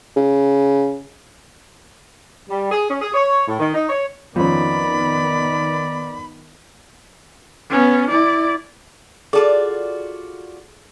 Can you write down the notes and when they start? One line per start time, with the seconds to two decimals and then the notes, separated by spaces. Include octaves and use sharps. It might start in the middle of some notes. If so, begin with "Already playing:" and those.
0.16 C#3
2.49 G3
2.72 G#4
2.89 C#4
3.02 G#4
3.14 C#5
3.48 A2
3.59 D#3
3.74 D#4
3.89 C#5
4.36 F2 D#3 B3 C#4 D5 B5
7.70 B3 C#4
8.10 E4 D5
9.33 F4 F#4 G#4 A4 D5 A5